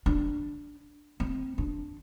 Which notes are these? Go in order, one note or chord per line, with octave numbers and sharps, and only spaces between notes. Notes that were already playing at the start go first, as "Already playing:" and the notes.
D4
C4
D4